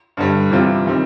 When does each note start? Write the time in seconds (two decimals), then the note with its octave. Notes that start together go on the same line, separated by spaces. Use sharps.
0.17 G2 D3 G3
0.51 C3 E3 G3 C4 F4
0.86 D#3 G3 C4